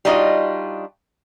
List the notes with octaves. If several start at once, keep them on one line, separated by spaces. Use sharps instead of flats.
G3 D4 D#4 F4 F#4 D#5